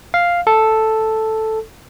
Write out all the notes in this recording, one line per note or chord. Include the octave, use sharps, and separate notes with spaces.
F5
A4